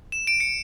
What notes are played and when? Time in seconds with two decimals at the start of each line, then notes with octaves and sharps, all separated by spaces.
0.12 E7
0.27 D7
0.40 C#7